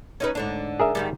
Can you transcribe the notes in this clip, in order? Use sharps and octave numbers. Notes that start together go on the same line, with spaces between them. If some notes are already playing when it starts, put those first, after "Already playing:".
C#4 D#4 B4
G#2 D3 D4
G#4 A#4 E5
G#2 D#3 G3